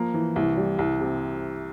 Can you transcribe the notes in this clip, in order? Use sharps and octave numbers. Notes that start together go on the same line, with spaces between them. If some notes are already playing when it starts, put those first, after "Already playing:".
Already playing: F3 A#3
E3
C2
G3
C2
C3